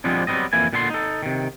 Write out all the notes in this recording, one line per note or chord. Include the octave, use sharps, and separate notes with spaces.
F3 G3 G#3 B3 C4 D4
F#3 G3 B3 C4 D#5
F2 E3 A#3 E4 G#5
A#2 D3 B3 A4 A#5 C6
D#4 A4
C3 D#3